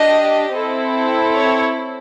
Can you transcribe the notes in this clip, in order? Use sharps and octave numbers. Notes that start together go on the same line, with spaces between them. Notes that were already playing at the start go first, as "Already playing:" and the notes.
Already playing: D4 G4 D#5
C4 E4 A4
C#5